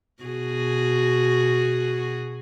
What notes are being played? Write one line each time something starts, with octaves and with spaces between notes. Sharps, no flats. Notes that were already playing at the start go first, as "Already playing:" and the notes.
B2 F#4 G#4